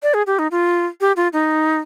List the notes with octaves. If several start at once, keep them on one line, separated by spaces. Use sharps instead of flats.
D5
G#4
G4
D#4
F4
G4
F4
D#4